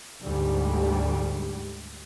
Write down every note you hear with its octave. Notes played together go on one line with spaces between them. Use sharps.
D2 G#2 G3